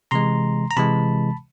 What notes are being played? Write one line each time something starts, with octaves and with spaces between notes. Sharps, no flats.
C3 E3 G#3 A#5 C6
A#5
C3 E3 G#3 A5 B5